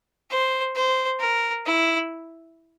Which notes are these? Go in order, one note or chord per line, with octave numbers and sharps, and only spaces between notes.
C5
C5
A#4
E4